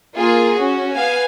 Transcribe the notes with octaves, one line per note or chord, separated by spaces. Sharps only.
A#3 F4 G#4
C#4 F#4
B3 F5 G#5